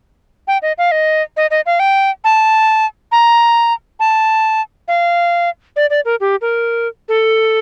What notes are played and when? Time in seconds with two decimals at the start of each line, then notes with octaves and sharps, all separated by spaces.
0.48 G5
0.62 D#5
0.78 F5
0.92 D#5
1.37 D#5
1.51 D#5
1.66 F5
1.80 G5
2.24 A5
3.12 A#5
4.00 A5
4.88 F5
5.76 D5
5.90 D5
6.05 A#4
6.20 G4
6.41 A#4
7.09 A4